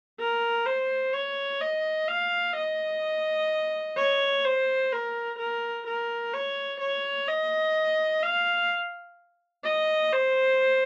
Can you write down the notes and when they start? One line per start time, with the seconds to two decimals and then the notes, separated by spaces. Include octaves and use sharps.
0.20 A#4
0.66 C5
1.14 C#5
1.61 D#5
2.08 F5
2.56 D#5
3.97 C#5
4.45 C5
4.92 A#4
5.39 A#4
5.87 A#4
6.34 C#5
6.80 C#5
7.28 D#5
8.23 F5
9.64 D#5
10.12 C5